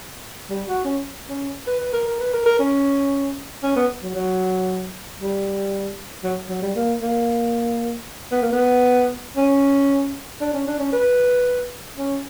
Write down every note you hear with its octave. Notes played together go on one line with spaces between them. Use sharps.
G3
F#4
C#4
C#4
B4
B4
A#4
A#4
B4
A#4
A#4
C#4
C#4
B3
F#3
F#3
G3
F#3
F#3
G3
A#3
A#3
B3
A#3
B3
C#4
D4
C#4
D4
C#4
B4
C#4